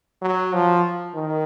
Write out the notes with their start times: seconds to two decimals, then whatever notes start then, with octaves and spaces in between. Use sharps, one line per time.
0.22 F#3
0.53 F3
1.15 D#3